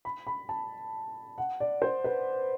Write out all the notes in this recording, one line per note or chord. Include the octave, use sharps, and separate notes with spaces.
B5
B5
A5
F#5
D5
C5
B4